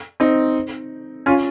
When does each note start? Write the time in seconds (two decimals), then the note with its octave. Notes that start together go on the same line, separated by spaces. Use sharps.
0.20 C4 D#4
1.26 C#4 F4